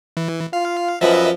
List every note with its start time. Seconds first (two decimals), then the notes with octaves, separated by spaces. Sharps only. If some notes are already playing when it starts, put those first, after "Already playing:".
0.17 E3
0.53 F4 F5
1.01 F#2 F3 B4 D#5 E5